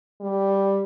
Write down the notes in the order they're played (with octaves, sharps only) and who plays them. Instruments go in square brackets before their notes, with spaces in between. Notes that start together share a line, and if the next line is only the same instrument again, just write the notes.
[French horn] G3